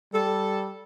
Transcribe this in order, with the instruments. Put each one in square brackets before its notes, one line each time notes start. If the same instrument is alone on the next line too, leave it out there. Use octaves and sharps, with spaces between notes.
[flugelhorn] G3 [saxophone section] A4